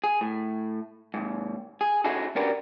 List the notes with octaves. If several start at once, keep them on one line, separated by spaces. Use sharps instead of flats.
G#4
A2
D#2 G#2
G#4
C#4 D#4 E4 F#4 G#4 A4
C#4 D4 F#4 G4 A#4 B4